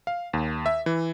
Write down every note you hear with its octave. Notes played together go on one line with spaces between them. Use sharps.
F5
D#2
E5
E3